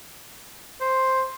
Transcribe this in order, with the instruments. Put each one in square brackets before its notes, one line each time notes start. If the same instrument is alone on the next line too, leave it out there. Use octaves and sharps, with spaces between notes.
[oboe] C5